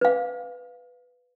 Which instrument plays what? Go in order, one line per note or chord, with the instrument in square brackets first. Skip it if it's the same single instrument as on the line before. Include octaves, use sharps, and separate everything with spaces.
[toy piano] B4 F5